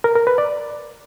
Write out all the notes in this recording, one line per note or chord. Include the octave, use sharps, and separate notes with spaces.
A#4
A#4
B4
D5